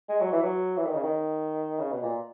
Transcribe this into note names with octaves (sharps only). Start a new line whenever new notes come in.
G#3
F#3
E3
F#3
E3
D#3
C#3
D#3
C#3
B2
A#2